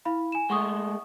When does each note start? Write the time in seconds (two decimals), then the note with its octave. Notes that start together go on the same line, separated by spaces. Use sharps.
0.05 E4 F5 B5
0.32 G#5 E7
0.50 G#3 A3 F#5 C#6 D#6